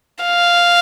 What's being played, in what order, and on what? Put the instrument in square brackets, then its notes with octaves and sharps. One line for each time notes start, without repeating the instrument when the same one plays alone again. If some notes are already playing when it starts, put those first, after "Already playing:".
[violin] F5